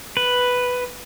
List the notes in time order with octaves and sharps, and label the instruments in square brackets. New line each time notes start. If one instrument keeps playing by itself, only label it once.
[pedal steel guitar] B4